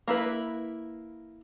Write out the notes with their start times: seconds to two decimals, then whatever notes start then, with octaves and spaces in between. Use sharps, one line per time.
0.07 A#3 E4 B4